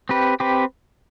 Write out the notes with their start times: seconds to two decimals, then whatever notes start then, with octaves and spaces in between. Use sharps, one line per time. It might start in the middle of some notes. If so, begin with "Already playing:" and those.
0.09 C4 G4 B4
0.40 C4 G4 B4